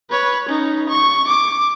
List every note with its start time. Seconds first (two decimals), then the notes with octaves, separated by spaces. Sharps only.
0.10 B4 C#5
0.49 C#4 D#4
0.89 C#6
1.28 D6